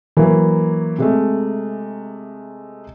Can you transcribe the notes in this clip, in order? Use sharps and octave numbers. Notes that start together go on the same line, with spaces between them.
E3 F#3 A#3
C3 G#3 A3